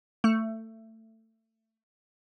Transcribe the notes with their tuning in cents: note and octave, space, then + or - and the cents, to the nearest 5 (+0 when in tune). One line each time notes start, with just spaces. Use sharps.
A3 +20